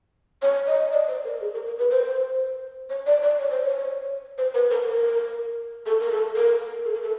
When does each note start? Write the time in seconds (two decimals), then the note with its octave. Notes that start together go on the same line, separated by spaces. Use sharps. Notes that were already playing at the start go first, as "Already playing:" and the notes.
0.42 C#5
0.67 D#5
0.92 D5
1.08 C5
1.24 A#4
1.41 G#4
1.54 A#4
1.66 A#4
1.78 B4
1.91 C5
2.90 C#5
3.06 D5
3.23 D5
3.39 C#5
3.51 C5
3.62 C#5
4.38 C5
4.55 B4
4.71 A#4
4.88 A#4
5.86 A4
6.00 A#4
6.11 A4
6.36 A#4
6.85 A4
6.94 A#4
7.02 A4